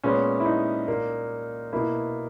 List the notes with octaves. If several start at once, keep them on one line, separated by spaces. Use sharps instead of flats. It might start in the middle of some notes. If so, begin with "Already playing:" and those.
A#2 G#3 B3 C#4
E4
D#4
A#2 A#3
B2 A#3 E4